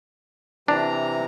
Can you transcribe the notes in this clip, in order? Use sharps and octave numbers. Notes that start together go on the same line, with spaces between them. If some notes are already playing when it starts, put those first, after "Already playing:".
C3 E3 D4 A#5